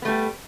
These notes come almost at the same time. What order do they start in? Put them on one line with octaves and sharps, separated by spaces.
B3 A3 G3